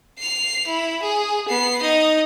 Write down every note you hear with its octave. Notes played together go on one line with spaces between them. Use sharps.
C7 F7
E4
G#4
B3 C7
D#4 D#5